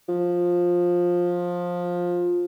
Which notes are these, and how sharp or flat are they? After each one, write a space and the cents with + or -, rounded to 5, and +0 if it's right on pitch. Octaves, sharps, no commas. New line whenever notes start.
F3 +15